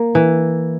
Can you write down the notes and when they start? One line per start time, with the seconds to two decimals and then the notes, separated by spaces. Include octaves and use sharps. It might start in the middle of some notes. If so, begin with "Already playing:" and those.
Already playing: A#3
0.15 E3